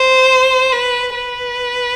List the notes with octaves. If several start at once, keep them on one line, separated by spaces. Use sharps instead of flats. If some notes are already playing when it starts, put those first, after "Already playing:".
Already playing: C5
B4
B4